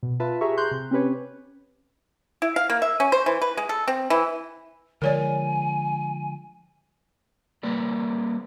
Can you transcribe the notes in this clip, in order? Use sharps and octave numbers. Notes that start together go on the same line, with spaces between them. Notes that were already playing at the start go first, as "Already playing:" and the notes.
B2
F4 B4 E5 A5 B5
G4 G#4 E5 A#5 C#6
A#5 C6 F#6 G6
C3
C4 C#4 G4 B4 C#5
E4
F5
A#3
E5
C#4
C5
E3
B4
G#3
A4
C4
E3
D3 F3 G#3 A#4 C#5 D5 G#5
G3 A#3 B4 D5